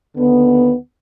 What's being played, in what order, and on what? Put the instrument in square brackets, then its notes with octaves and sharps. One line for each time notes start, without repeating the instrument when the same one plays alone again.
[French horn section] D#2 D3 B3